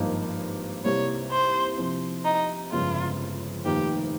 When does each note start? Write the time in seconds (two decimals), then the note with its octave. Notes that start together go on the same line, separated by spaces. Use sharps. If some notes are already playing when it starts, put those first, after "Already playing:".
Already playing: G#1 G2 F3 A#3 D#4
0.85 C2 C3 G3 A#3 C#5
1.31 C5
1.77 C3 F3 C4
2.24 D#4
2.71 G1 F2 C#3 G#3 F4
3.65 F1 F2 D#3 A#3 G4